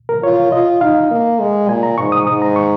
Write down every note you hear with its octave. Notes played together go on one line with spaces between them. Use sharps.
A#4
F4 C#5
F4 D#5
D#4 F5
A#3
G#3
A#2 G#5
A#5
G#2 C#6
D#6
G#2 D#6
A#5
C#6